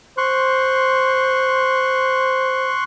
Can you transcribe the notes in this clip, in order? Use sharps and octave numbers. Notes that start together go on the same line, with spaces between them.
C5 C6 C#6 F#6